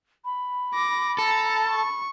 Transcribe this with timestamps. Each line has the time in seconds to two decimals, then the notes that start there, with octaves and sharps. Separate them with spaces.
0.25 B5
0.74 D6 A#6
1.18 A4 A5 A#5
1.70 C#6